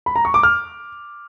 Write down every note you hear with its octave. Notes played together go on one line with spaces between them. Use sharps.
B5
A#5
C#6
D6
F6